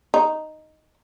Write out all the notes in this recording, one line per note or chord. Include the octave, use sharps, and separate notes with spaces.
D#4